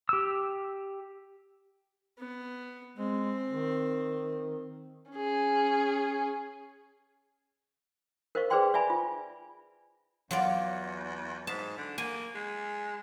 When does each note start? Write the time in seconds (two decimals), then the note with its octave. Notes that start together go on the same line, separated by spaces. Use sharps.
0.09 G4 E6
2.18 B3
2.98 G#3 C4
3.49 D#3
5.12 C#4 G#4
8.35 A#4 C5 D#5 F5 C#6
8.50 G#4 B4 C5 D5 G5 C6
8.74 D5 E5 G#5 B5
8.90 F4
10.31 E2 F#3 F4 D5
11.47 G#2 A5
11.77 D3
11.98 A#3 G#5
12.35 G#3